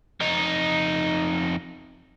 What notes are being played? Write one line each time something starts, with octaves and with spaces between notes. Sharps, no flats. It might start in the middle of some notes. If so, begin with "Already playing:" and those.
F2 D#4